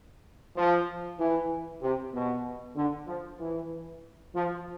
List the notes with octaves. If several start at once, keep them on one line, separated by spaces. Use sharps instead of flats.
F3
E3
C3
B2
D3
F3
E3
F3